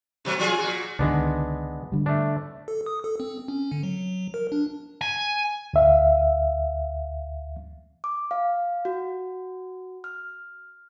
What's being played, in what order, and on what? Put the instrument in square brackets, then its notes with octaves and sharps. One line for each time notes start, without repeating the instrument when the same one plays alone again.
[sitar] B2 F#3 A3
F3 F4 G#4
A#2 F#4
[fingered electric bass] C#2 D3 D#3 [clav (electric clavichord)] G#3 B3 D4
[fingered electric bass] D3 G3
[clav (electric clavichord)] A3 D4
[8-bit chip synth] A4
D#6
A4
C4
C#4
D3
F#3
F#3
A#4
D4
[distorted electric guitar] G#5
[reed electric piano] D2 E5 F5
[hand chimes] D6
F5
F#4
F6